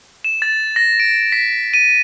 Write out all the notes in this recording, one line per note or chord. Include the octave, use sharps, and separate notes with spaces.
E7
A6
A#6
D7
B6
D#7